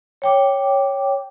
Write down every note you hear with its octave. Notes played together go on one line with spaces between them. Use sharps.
C#5 G5 D6